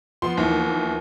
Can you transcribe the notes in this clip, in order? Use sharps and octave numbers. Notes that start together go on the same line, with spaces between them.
F3 B3 C6
D#2 E3